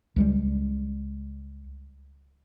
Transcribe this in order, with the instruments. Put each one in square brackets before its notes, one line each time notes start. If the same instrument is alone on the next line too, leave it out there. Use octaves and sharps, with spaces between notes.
[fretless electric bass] C#2 G3 G#3